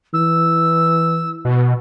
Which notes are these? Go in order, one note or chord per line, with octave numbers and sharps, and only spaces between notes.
E3 E6
B2